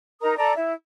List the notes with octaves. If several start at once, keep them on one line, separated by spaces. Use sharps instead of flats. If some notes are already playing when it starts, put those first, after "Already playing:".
D#4 A#4 A#5 D#6
A4 D5 A#5
E4